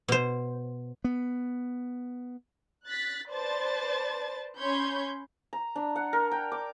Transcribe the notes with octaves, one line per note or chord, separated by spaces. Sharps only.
B2 C5
B3
F#6 A6 B6
B4 C5 D5 A5 A6
C#4 C#5 B5 C6 G6 G#6
A#5
D4
F#5
A#4
G5
D6